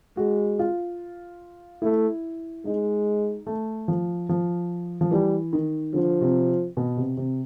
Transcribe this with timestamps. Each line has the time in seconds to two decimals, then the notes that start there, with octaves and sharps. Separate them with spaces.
0.17 G#3 F#4
0.59 F4
1.82 A3 E4
2.65 G#3 D#4
3.47 A3
3.88 F3
4.29 F3
5.01 F3
5.11 E3 G3
5.53 D#3
5.94 D3 F3
6.21 C3
6.77 B2
6.97 C3
7.17 C3